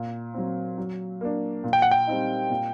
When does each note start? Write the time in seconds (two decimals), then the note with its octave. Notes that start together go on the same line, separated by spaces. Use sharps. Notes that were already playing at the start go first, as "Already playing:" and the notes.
Already playing: A#2
0.34 F#3 C4
0.78 F#3
1.21 A#3 D4
1.64 A#2
1.73 G5
1.82 F#5
1.91 G5
2.07 G3 C4 D#4
2.50 A#2